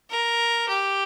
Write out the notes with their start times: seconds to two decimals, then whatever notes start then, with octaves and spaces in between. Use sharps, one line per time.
0.10 A#4
0.68 G4